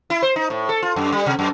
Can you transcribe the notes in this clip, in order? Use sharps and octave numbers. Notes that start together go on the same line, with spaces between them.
E4
C5
D#4
A2
A4
F4
F#2
G3
C3
F#2